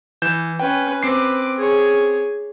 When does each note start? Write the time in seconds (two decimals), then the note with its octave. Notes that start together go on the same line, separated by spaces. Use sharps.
0.22 E3 G6 E7
0.60 C#4 B4 G5
1.03 C4 B4 D6 C7
1.57 G#4 C#5